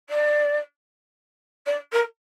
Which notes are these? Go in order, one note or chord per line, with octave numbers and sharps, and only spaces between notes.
D5
D5
A#4